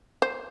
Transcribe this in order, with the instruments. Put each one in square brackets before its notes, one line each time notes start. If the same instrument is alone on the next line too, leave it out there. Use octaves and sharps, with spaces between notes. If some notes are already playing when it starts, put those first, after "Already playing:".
[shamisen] C5